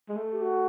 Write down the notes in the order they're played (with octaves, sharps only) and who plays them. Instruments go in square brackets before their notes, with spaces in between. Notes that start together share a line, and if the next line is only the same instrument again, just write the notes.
[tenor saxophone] G#3
A3
[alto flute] G4
F#4